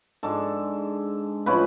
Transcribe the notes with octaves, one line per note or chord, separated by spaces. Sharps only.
G#2 G#3 D4 A4
A2 F3 G#3 C#4 B4